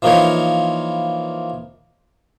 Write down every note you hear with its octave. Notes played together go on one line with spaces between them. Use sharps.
E3 F3 A#3 D#4 A#4 C#5